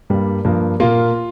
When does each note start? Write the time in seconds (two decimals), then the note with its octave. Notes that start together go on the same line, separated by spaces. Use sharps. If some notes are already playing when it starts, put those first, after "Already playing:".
0.10 G2 G3 A#3
0.45 G2 F3 A#3
0.80 A#2 A#3 F4